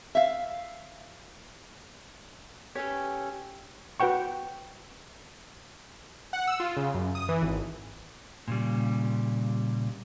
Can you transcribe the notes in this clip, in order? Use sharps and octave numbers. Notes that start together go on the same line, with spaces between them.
E5 F5
C#4 G4 A4 B4 C#5
F#4 B4 F#5 G5 C#6
F#5
E6
F4
C#3
F#2
D#6
E3
G#1
A#2 C#3 G3